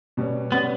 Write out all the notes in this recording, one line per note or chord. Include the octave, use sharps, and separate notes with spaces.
B2 G3 C#4
B2 G3 B3 C#4